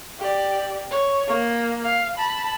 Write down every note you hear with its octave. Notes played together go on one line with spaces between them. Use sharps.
G4 D5
C#5
A#3
F5
A5 B5